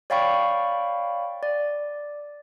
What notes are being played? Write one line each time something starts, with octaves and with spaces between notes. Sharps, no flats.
C#5 D5 F5 G5 B5 C#6
D5